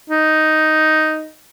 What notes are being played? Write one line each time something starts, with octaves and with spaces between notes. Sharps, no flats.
D#4